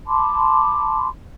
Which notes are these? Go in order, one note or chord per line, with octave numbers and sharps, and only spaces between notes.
A5 B5 C6 D6